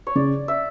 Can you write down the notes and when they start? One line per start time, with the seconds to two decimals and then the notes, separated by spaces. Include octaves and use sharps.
0.07 C#5
0.15 C#3 D5
0.48 E5